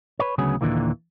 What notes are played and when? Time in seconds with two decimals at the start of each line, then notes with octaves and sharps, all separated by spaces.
0.19 B4 C#5
0.38 D2 C#3 F#3 B3 G#4
0.61 D#2 A#2 D3 E3 A#3